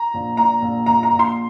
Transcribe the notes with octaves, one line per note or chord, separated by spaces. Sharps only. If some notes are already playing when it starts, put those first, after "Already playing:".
Already playing: A#5
A#1
A#2 A#5
A#1
A#1 A#5
A#5
A#1
C6